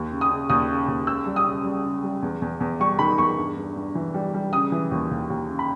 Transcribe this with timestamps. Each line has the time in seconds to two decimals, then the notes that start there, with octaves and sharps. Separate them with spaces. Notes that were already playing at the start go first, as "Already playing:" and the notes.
Already playing: D#2
0.12 C#3
0.21 D#6
0.30 C#3
0.50 D#2 D#6
0.69 C#3
0.88 D#2
1.07 C#2 E6
1.26 G3
1.36 D#6
1.45 C#3
1.64 G3
1.84 C#3
2.03 G3
2.22 E2
2.42 E2
2.60 E2
2.80 G3 C#6
2.99 D#3 B5
3.18 E2 C#6
3.37 G2
3.57 G2
3.76 G2
3.95 E3
4.14 G3
4.34 G3
4.53 C#3 D#6
4.72 E3
4.91 D#2
5.11 D#2
5.30 D#2
5.49 C#3
5.59 B5